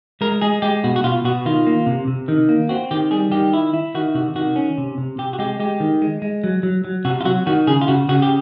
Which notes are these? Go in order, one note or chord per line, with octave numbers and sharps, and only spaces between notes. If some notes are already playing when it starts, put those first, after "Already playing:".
G#3 A#4
G#3 G#4
G#3 G4
B2 F#4
F#4
B2 F4
B2 F#4
D#3 F4
A#3
C3
C3
D#3
A#3
C4 F#4
D#3 G4
G3 G#4
D#3 G4
E4
E4
D#3 F#4
C3 F#4
D#3 F#4
C#4
C3
C3
C3 G4
F#4
G#3 G4
G#3 G4
D#3
G#3
G#3
F#3
F#3
F#3
C3 F#4
F4
F#3 F#4
D#3 F#4
C#3 G#4
F4
C#3 F#4
C#3 F#4
G4